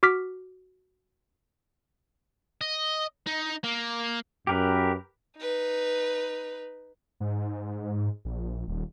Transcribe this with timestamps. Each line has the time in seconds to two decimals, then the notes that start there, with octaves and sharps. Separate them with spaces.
0.03 F#4 D6 F6 B6
2.61 D#5
3.27 D#4
3.64 A#3
4.47 F#2 G4 A#4 B4
5.37 D#4 B4
7.20 G#2
8.25 A#1
8.68 D#1